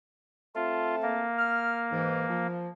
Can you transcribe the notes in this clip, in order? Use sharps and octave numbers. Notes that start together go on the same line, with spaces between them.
A3 C4 F4 A5
A#3
F6
G#2 E3
F3